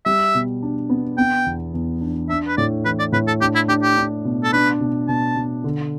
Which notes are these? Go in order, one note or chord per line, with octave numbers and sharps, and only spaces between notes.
G3 E5
B2
D4
B3
B3 G5
E2
E2
D4
D4 E5
B4
A2 D5
E3 B4
D5
A2 B4
A4
D4 G4
E4
D4 G4
G4
D4
B2
A4
D4 B4
B2
B2 A5
B2
D3